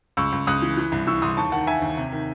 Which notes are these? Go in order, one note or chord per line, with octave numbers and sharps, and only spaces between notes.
C#2 C#6 E6
C#2
C#2 D#6 F#6
E3
E3
C2
E3 C#6 E6
C2 C6 D#6
D#2 A5 C#6
D#3 F#5 A5
D#3 E5 G#5
D#2
C3
D#3